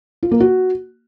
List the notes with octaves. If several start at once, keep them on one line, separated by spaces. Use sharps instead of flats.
F4
A#3
F#4